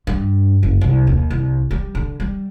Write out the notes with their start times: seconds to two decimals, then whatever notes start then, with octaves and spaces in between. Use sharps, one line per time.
0.07 G2
0.63 F#1
0.81 C2
1.07 D#2
1.30 C2
1.71 G3
1.95 D3
2.20 G3